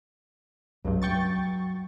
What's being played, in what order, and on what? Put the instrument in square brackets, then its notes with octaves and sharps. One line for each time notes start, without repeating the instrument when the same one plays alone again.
[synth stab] C#2 G2 [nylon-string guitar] F#3
[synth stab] G5 C#6 A6